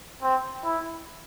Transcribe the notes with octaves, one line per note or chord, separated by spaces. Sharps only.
C4
E4